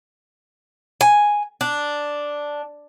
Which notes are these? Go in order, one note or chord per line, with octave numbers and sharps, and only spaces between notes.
G#5
D4